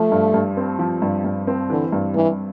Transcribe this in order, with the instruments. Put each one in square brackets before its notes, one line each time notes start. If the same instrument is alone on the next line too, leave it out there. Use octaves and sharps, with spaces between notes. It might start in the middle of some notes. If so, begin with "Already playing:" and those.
Already playing: [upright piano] F3 [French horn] A3
[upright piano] G2
G2
C4
F3
G2
G2
C4
[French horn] D3 [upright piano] E3
[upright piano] G2
[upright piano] G2 [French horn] E3